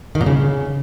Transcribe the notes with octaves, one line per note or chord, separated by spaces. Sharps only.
D#3
A#2
C#3